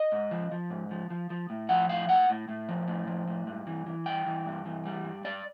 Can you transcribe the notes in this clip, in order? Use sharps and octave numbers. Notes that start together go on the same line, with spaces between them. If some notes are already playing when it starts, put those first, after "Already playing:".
Already playing: D#5
G#2
F3
F3
G#2
F3
F3
F3
A2
F3 F#5
A2 F5
A2 F#5
A2
A2
F3
A2
F3
A2
G2
E3
E3
G2 G5
E3
G2
E3
G3
G2
G2 D5